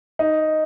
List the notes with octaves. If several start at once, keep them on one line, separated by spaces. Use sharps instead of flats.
D#4